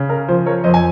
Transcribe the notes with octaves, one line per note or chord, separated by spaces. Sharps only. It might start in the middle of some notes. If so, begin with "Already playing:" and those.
Already playing: C#3
A#4
F3 C5
A#4 C#5
F2 C5 D#5
G#5